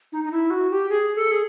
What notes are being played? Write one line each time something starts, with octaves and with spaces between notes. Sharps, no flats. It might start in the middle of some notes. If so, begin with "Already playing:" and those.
D#4
D#4
E4
F#4
G4
G#4
A4
G#4